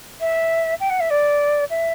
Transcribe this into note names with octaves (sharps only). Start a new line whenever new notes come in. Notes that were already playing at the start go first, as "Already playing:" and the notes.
E5
G5
F#5
E5
D5
E5